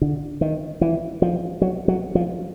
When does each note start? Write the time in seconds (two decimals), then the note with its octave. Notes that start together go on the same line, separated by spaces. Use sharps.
0.02 D3
0.41 D#3
0.81 E3
1.22 F3
1.62 F#3
1.88 F#3
2.15 F3